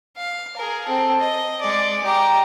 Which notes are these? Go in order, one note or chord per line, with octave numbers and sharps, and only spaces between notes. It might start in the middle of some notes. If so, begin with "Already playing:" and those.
F5
G#4 A#4
C4 A4
D#5
G#3 D5
G4 A#5